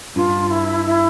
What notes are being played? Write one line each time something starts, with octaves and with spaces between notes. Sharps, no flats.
G2 F4
E4
E4